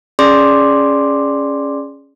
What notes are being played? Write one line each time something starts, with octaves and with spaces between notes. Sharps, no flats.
C#4 G#4 D5 C6 D6